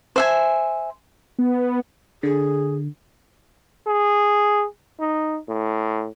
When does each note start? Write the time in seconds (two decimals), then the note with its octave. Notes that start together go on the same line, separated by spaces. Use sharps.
0.16 C5 E5 G#5
1.39 B3
2.23 D3 G#4
3.87 G#4
5.00 D#4
5.48 A2